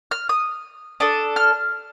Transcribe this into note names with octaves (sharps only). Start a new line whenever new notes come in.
F6
D#6
D4 A4 D#6
F6